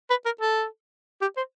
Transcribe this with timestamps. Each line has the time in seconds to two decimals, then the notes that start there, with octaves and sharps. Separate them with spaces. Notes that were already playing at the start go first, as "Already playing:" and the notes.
0.10 B4
0.25 A#4
0.41 A4
1.21 G4
1.37 C5